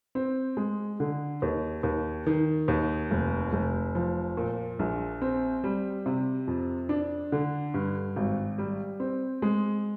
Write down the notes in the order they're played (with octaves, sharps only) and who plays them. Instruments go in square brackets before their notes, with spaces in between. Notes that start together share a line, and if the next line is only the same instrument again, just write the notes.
[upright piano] C4
G#3
D3
D#2
D#2
D#3
D#2
F1
F1
F3
A#2
A#1
C4
G3
C3
F2
D4
D3
G2
G#1
G3
C4
G#3